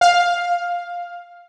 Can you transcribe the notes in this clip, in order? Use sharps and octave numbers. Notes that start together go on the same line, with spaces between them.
F5